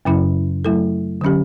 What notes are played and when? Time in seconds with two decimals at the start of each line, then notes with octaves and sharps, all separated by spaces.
0.05 F#2 C#3 F#3 C#4 E4
0.65 F#3 A3 E4 A4
1.21 D3 F#3 C#4 G4